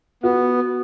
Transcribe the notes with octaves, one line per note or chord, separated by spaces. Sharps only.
B3 F#4